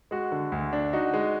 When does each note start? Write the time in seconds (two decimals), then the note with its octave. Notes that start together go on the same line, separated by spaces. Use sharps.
0.11 G#3 F#4
0.32 D3
0.52 D2
0.73 D4
0.93 D#4 F#4
1.14 G#3